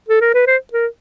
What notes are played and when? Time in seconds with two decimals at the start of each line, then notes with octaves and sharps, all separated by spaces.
0.09 A4
0.21 A#4
0.34 B4
0.47 C5
0.73 A#4